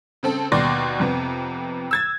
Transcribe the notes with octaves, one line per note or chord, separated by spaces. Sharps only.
C#3 C4 A4
D#2 B2 D5 C6 D6 A#6
F2 C3 B3
E6 G#6 A6